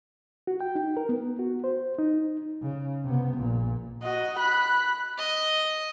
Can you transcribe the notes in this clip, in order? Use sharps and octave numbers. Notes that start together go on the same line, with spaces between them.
F#4
G5
D#4
A#4
B3
F#4
C5
D#4
C#3
C3 B3
A#1 A#2
F#4 D#5
B5 F#6
D#5